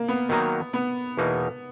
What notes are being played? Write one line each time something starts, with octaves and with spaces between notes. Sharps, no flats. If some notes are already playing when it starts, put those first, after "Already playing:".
Already playing: A#3
B3
D#3 F#3 A#3 D#4
B3
E2 B2 A#3 D#4